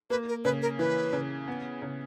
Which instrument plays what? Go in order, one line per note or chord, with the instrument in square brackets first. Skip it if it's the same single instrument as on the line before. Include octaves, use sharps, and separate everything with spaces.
[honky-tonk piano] A#3 [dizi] B4
[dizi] A#4
[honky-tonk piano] C#3 [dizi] B4
[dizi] A#4
[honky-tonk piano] E3 [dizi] B4
[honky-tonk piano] C#3
B3
C#3